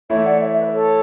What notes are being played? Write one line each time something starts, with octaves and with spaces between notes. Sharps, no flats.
E3 A3 E4 C#5 E5
D5 F#5
C#5 E5
E5
B4 D5
A4 C#5